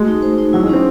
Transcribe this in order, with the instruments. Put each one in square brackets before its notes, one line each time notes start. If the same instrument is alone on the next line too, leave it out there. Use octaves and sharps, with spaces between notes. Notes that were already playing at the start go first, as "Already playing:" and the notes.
Already playing: [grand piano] G#3 [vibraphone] A3 F#4
[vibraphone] D#4
C5
D#4
[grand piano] F#3 [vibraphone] E4
[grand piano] G#3
[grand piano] C4 [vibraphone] C#4